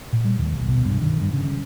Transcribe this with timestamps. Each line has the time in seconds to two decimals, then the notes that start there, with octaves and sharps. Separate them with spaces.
0.13 A#2
0.25 G3
0.38 D#2
0.52 B1
0.68 B2
0.85 G2
1.02 D#3
1.22 G2
1.33 C#3